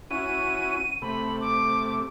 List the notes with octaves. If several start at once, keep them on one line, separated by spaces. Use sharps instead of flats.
C#4 E4 F#4 D#7
C3 A3 B5
D6